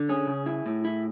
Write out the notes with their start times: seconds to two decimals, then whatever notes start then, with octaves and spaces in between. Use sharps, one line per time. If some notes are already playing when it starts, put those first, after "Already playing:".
Already playing: D3
0.09 C#4 G#4
0.27 C#3
0.46 E4
0.66 A2
0.85 E4